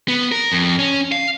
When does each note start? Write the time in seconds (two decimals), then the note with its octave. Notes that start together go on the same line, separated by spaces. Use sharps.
0.08 B3
0.32 A#4
0.52 F2
0.79 C#4
1.12 F5